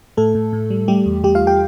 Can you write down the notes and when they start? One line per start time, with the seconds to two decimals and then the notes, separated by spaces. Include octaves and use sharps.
0.17 A2 A3 A4
0.35 A2
0.53 A2
0.70 G3
0.88 G3 A3 G4
1.06 E2
1.24 E2 G3 G4
1.35 F4 F5
1.41 E2
1.47 G4 G5